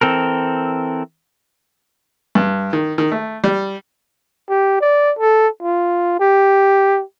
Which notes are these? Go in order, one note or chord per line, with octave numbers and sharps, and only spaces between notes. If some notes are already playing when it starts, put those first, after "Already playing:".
E3 C4 A4 A#4
G2
D#3
D#3
A3
G3
G4
D5
A4
F4
G4